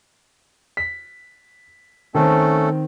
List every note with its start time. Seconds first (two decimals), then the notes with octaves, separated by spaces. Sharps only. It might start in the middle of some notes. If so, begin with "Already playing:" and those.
0.77 B6
2.15 D#3 A3 C4 C#4 A4